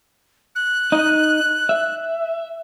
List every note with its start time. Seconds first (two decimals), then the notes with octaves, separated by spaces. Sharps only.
0.56 F#6
0.92 D#4 D#5
1.69 E5